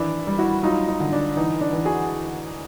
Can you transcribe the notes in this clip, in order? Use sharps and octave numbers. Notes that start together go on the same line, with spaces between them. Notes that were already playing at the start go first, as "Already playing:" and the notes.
Already playing: D#3 E3 D4 E4
G3
E4 F#4
F#3 D#4 F4
D#4
D3
D4
E3 D#4
D4
E3
F#4 G#4